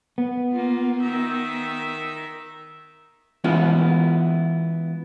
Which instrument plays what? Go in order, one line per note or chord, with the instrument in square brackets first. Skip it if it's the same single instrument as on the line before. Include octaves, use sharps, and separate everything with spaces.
[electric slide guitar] B3
[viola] A#3 F4
D#3 E5
[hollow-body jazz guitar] E3 G#3 B3 C#4 E4 F4